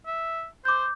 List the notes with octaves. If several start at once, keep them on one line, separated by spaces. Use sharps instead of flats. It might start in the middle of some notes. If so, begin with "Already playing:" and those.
E5
C5 D6 G6